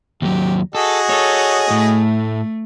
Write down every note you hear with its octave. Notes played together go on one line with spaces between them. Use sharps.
D#2 F#3 G4
F#4 G#4 A4 D#5
A4 C#5
A2 A3